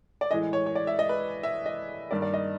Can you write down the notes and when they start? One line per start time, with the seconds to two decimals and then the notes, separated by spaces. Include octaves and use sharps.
0.21 D5
0.31 A2 E3 G#3 D#5
0.53 C#5
0.66 C#5
0.75 D5
0.87 E5
0.99 D#5
1.09 B4
1.43 E5
1.66 D#5
2.11 G2 D#3 G3 A#3 D5
2.22 D5
2.34 D#5